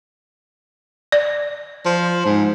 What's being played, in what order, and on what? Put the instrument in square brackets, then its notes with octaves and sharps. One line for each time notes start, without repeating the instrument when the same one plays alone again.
[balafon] D5
[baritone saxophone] F3
G#2